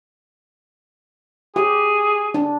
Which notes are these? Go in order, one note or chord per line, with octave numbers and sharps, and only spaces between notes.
G4 G#4
D4